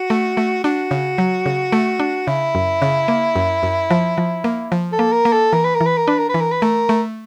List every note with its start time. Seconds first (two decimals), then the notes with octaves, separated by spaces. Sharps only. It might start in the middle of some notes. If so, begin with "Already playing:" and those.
Already playing: F#4
0.10 A3
0.37 A3
0.64 D4 F#4
0.91 C#3
1.18 F#3
1.46 C#3
1.72 A3
2.00 D4
2.27 C#3 E4
2.55 F#2
2.82 C#3
3.08 A#3
3.36 F#2
3.63 F#2
3.91 F3
4.18 F3
4.44 A#3
4.72 F3
4.92 A4
4.99 A#3
5.12 A#4
5.25 A#3
5.33 A4
5.53 E3 A#4
5.64 B4
5.74 A#4
5.81 E3
5.86 B4
5.97 A#4
6.08 D4 B4
6.18 A#4
6.29 B4
6.34 E3
6.40 A#4
6.51 B4
6.62 A3 A#4
6.89 A3